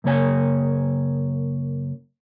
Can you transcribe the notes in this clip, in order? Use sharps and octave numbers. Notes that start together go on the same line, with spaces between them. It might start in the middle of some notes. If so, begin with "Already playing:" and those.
F#2 C#3 A#3 C#5 G#5